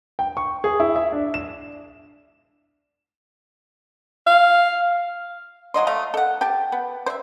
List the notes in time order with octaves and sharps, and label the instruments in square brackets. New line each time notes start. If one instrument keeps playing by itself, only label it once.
[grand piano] G5
C#6
G#4
E4
E5
D4
E7
[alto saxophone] F5
[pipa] F3 F#3 D#5 C6
A3 D#5 F5
A4 F#5
G4 G5 A5
B3
C5 E5